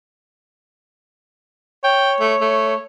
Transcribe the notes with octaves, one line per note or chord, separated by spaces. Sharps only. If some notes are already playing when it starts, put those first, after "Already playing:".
C#5 G5
A3
A3